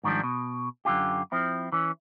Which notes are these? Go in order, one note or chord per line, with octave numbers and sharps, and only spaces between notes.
G#2 D#3 F3 G3 D4
B2
F#2 D3 F4 G4
F3 C4 E4
E3 C#4